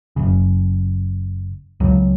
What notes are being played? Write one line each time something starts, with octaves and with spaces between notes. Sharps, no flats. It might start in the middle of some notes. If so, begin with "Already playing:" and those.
F#1 F#2 C#3
C#2 C#3 F#3